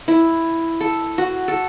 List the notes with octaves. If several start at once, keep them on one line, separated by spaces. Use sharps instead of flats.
E4
A4
F#4
A4